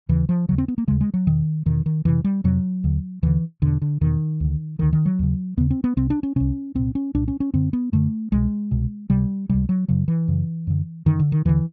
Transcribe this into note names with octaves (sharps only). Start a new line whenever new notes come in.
D#2 C#3 E3
F3
D#2 C#3 F#3
C4
B3
A#3
D#2 C#3 G#3
G#3
F#3
E2 B2 D#3
E2 B2 D#3
D#3
F2 C3 E3
G3
F2 C3 F#3
D#2 D3
D#2 D3 E3
E2 B2 D3
D3
E2 B2 D#3
D2 D3
D2 D3 D#3
D#3
F#3
D#2 C#3
D#2 C#3 B3
C4
B3
C2 C3 C4
D4
C#4
C2 C3 C#4
C2 A#2 C4
C#4
C2 A#2 D4
C#4
C#4
F#2 D3 C4
B3
F#2 D3 A3
C2 B2 G#3
C2 B2
C#2 C3 G3
C#2 C3 G3
F#3
F#2 C#3 F#3
E3
F#2 C#3
F#2 D3
F#2 D3 D#3
D3
D#3
D#2 D3 E3